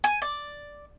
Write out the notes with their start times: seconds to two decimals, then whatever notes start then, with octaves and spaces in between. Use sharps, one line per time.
0.04 G#5
0.22 D5